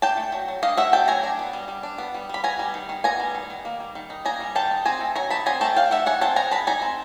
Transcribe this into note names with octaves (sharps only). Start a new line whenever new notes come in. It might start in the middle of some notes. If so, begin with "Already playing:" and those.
D4 G5 A5
A3
F#3
F#3
D4 D#5 F5
A3 E5 F#5
F#3 G5 A5
F#3 G#5 A#5
D4
B3
G3
G3
D4
B3
G3
G3 B5
B3 G#5 A#5
G3
D#3
D#3
B3 G#5 A#5
G3
D#3
D#3
A#3
G3
D#3
D#4
A#3 G#5 A#5
G3
D#3 G5 A5
D#4
C4 G#5 A#5
A3
F#3 G#5 A#5
D#4 A5 B5
C4 G#5 A#5
A3 G5 A5
F#3 F5 G5
D#4 E5 F#5
D#4 F#5 G#5
C4 G5 A5
G#3 G#5 A#5
G#3 A5 B5
D#4 G#5 A#5
C4